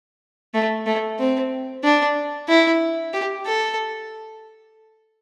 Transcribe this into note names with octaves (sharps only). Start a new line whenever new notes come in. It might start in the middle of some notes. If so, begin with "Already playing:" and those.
A3
A3
C4
D4
E4
G4
A4